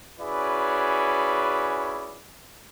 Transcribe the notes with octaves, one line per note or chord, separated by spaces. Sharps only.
C#4 E4 F#4 G#4 B4 D5